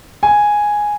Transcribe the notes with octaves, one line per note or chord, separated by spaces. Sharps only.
G#5